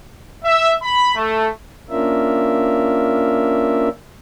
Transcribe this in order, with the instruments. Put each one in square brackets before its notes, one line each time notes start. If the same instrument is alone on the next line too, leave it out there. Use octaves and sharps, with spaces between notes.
[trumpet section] E5
B5
A3
[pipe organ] A#3 C#4 D4 F4 A#4 E5